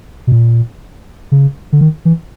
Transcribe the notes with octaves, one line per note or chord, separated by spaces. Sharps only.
B2
A#2
C#3
D3
D#3
E3